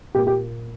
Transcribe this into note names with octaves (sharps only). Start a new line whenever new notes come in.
A#2 A#3 G4
G4